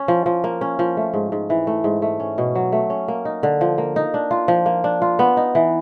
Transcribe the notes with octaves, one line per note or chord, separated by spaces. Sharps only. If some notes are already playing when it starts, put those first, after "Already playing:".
Already playing: C#4
F3
F3
A#3
C#4
F3
A3
G#2
G#2
E3
A3
G#2
A3
C#4
B2
F#3
A3
C#4
A#3
D#4
D3
F3
A#3
D#4
D4
F4
F3
A#3
D4
F4
B3
D#4
E3